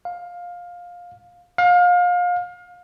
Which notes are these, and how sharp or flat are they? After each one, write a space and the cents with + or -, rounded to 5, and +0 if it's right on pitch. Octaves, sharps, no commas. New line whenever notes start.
F5 +15
F5 +30